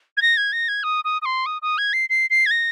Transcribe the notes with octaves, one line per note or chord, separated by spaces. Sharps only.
G#6
A#6
G#6
A#6
G#6
D#6
D#6
D#6
C6
D#6
D#6
G#6
C7
C7
C7
G#6
A#6